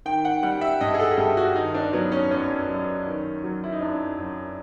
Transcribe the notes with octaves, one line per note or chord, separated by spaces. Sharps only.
D#3 G5
F#5
G3 F#5
E5
G2 D#5
G#4
A4
G2 G4
F#4
D#3 D#4
D4
F#3 B3
C#4
F#2 C#4
F#2
D#3
F#3
E4
D#4
F#2 D4
F#2